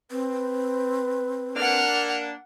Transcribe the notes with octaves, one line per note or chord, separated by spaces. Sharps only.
C4 B4
A#3 D4 F#5 F6